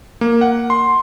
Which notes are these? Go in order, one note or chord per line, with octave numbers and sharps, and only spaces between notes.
A#3
F#5
C6